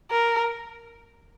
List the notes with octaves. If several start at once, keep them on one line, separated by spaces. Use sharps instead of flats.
A#4